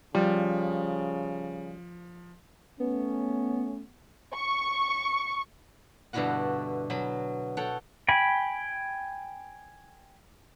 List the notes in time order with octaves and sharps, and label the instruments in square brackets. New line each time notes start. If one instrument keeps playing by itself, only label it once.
[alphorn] C#3 [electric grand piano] F3 [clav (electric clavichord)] G3
[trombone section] A3 C#4 [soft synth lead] B3
[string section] C#6
[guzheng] G2 B2 D3 E4 F#4 F#5
B2 F#3 B5
A4 C#5 F#5 G5
[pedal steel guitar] G5 G#5 B5